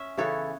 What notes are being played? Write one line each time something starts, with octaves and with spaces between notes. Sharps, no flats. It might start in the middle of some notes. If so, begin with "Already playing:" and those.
Already playing: C#4 E5
C#3 E3 B3 E4 A4 C#5